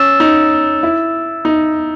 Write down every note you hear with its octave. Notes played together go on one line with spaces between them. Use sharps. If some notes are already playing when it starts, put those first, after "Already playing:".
Already playing: C#4 E6 A6 E7
D#4
E4
D#4